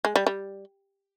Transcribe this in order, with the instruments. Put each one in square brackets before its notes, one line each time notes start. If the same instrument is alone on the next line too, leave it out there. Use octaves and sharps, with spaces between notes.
[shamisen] G#3
G3
G3